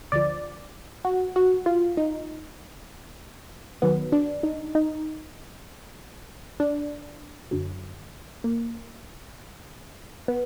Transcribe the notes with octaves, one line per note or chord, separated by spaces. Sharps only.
D2 D3 F3 D5
F#4
F#4
F4
D#4
D#2 D#3 F#3 B3
D4
D#4
D#4
D4
F#2 D3 F#3
A#3
B3